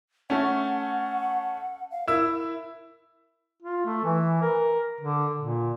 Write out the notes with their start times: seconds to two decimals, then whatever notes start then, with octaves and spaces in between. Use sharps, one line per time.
0.30 A3 C#4 F#5
1.91 F5
2.07 E4 A#4 E6
3.62 F4
3.86 A3
4.05 E3
4.42 A#4
5.01 D3
5.40 A#2